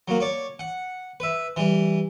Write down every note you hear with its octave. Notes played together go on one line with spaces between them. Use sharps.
F#3 A#3
C#5 D5
F#5
B4 E5
E3 G3